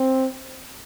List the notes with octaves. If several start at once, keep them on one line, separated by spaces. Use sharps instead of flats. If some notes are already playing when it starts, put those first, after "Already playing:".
Already playing: C4